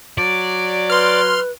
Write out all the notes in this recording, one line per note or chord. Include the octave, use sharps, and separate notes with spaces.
F#3 D5
B4 C6 F6